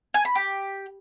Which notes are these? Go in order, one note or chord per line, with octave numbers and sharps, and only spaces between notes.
G#5
B5
G4